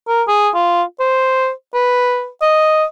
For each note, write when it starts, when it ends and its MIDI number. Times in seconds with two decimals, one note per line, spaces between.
0.08 0.23 70
0.28 0.49 68
0.55 0.83 65
1.00 1.50 72
1.74 2.28 71
2.42 2.84 75